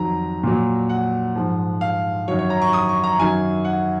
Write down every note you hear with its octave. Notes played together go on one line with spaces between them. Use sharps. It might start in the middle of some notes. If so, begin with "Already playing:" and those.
Already playing: F2 D#3 F#3 A#5
A#2 F#3
F#5
G#2 F3
F5
F#2 D#3 F#3 C#5
C#5
A#5
C#6
D#6
C#6
A#5
F#2 D#3 F#3 G#5
F#5